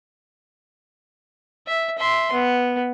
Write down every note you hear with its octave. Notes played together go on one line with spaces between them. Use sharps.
E5
E5 C6
B3